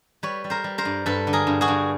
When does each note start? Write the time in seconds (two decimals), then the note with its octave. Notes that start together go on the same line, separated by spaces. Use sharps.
0.23 G3 B4 C#5
0.44 G3
0.50 A#4 C5
0.64 G3
0.78 A#4 C5
0.85 G2
1.06 G2 A4 B4
1.27 D3
1.33 G#4 A#4
1.47 G2
1.61 F#4 G#4
1.68 G2